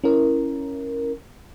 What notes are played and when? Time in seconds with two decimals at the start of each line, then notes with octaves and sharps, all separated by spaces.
0.04 C#4 E4 A#4